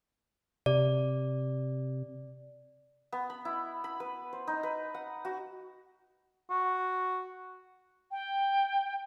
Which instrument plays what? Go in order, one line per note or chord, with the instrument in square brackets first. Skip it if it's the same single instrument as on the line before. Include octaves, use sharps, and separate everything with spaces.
[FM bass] C3 [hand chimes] D5
[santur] B3
B5
E4
B5
B4
C5
D#4
B4
F#5
F#4
[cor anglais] F#4
[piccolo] G5